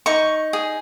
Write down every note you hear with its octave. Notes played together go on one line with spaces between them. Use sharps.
D#4 C#6
G#4